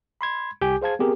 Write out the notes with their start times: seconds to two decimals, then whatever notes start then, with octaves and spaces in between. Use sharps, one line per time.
0.21 B5 C6 G#6
0.61 C2 G4 G#5 D6 G6
0.82 G#4 C5 F5 A5 G#6
0.99 B3 C4 G4 G#4 A#4